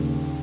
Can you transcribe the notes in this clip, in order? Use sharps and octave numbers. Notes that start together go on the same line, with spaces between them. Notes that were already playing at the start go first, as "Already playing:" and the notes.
Already playing: D#2 C#3